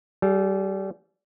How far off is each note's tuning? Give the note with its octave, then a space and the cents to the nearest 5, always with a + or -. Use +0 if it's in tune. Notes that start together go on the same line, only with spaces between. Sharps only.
G3 -25 G#4 +30